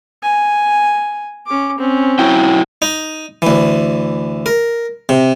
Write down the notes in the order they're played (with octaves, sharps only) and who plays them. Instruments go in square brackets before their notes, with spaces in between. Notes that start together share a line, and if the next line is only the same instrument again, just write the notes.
[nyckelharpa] G#5
C#4 D6
C4 C#4
[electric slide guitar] F#3 E4 G5
[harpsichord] D#4
D2 E3
A#4
C3